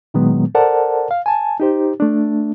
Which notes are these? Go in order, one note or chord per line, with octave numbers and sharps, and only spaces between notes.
A#2 D#3 F#3 G#3 B3
A4 A#4 C5 D5 F#5 A5
F5
G#5 A5
D#4 G4 C5
A3 D4